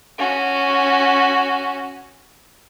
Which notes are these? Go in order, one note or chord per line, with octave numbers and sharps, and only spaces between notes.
C#4 F#4